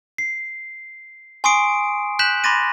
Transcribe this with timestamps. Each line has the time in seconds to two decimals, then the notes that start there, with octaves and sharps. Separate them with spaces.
0.18 C7
1.44 G#5 C6 C#6 D#6 C7 D7
2.19 F#6 G6 B6 E7 F#7
2.44 B5 C6 D6 A6 A#6 D#7